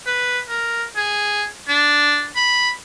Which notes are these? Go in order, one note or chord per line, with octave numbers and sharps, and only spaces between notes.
B4
A#4
G#4
D4
B5